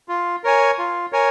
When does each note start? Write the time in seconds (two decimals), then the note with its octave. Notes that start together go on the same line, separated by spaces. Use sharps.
0.08 F4
0.44 A#4 C#5 G#5
0.78 F4
1.12 A#4 C#5 G#5